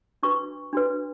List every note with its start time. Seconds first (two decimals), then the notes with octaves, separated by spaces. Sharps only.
0.23 D4 F#4 B4 C#6
0.73 D4 F#4 B4